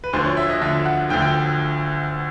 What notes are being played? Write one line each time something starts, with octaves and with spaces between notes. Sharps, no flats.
B4
D2 D3 F3 C5
C#5
E5
D#5
D2 D3 F3 E5
F#5
D2 D3 F3 G5
G5